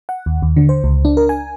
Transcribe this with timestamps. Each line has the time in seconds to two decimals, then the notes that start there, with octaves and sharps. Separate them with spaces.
0.09 F#5
0.26 D#2
0.42 D#2
0.56 D3
0.69 C5
0.84 C#2
1.05 D4
1.17 A#4
1.29 G#5